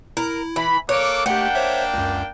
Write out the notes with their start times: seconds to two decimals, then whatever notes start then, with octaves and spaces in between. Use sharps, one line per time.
0.17 E4 A#4
0.56 E3 B5
0.89 A#3 A4 C#5 D6 F#6
1.26 A3 A#3 D4 G4 F#5 G5
1.55 C5 C#5 E5
1.94 C#2 F#2